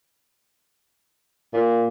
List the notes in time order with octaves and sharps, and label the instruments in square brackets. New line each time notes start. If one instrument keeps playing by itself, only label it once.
[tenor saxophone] A#2